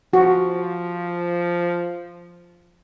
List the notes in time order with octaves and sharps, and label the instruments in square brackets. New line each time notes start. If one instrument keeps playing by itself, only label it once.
[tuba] F3 [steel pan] F#4